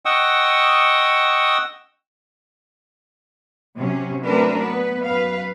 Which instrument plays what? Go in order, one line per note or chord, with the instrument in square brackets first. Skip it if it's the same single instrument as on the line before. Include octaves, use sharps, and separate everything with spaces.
[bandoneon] D#5 F#5 G5 C#6 D#6 E6
[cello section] C3 F#3 C#4
F#3 A3 C4 D4 A#4 B4
B3 B4
F#2 B4 F5